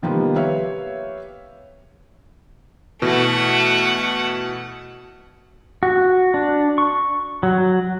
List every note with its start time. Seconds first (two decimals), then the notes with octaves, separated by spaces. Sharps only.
0.02 C3 D#3 F3 G3 A#3 B3
0.36 G4 B4 C#5 E5 F5
3.02 B2 E3 A3 F#5
5.83 F#4
6.34 D4
6.78 C#6
7.43 F#3